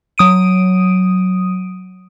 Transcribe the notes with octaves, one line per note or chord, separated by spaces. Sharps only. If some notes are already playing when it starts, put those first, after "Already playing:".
F#3 D#6 D7 D#7